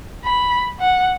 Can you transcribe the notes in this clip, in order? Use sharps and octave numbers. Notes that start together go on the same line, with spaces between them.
B5
F#5